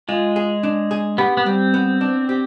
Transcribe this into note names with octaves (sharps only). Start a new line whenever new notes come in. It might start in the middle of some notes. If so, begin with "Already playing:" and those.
G#3 F4
G#4
D4
G#4
B3 G4
B3
G3 C4
B3
D4
G4